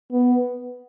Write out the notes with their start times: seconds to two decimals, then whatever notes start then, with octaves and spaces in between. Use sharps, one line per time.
0.12 B3